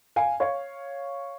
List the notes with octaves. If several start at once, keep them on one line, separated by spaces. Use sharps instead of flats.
F5 G#5
C#5 F5